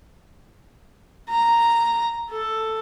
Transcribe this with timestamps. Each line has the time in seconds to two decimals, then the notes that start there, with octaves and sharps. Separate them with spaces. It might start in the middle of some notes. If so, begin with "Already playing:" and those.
1.30 A#5
2.31 A4